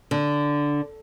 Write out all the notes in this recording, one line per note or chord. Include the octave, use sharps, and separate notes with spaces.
D3